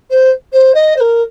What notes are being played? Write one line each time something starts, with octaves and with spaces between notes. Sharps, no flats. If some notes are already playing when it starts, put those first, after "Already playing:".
C5
C5
D#5
C5
A#4